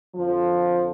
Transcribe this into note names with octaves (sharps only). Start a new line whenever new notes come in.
F2 D3 F3